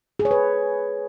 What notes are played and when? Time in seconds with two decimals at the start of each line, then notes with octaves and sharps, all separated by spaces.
0.19 G#4
0.25 C#5
0.31 B4